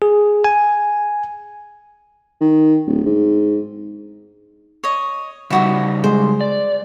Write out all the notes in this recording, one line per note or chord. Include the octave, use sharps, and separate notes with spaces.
G#4
G#5
D#3
D1
G#2
C#5 D#5
C#3 G3 D#4 E4 F#4 B5
G#3 C5
D5